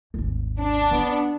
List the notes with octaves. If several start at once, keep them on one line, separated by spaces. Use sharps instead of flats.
G#1 D#2
D4
D3 B3